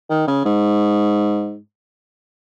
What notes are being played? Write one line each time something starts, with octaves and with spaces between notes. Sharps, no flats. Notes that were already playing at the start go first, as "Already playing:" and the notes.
D#3
C#3
G#2